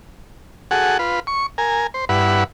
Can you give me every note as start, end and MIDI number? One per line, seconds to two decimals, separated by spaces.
0.71 0.98 66
0.71 0.98 68
0.71 0.98 69
0.71 0.98 78
0.99 1.20 65
0.99 1.20 71
1.27 1.46 85
1.58 1.87 70
1.58 1.87 80
1.94 2.05 72
2.09 2.44 43
2.09 2.44 64
2.09 2.44 71
2.09 2.44 78